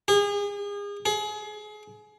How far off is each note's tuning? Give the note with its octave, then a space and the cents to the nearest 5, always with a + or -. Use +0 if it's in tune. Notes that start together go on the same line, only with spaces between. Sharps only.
G#4 -35
G#4 +30